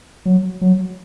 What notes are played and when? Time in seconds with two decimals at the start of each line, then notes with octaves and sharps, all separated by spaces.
0.26 F#3
0.61 F#3